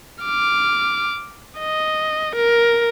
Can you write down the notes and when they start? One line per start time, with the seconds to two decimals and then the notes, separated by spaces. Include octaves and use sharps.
0.23 D6 F6
1.59 D#5
2.35 A#4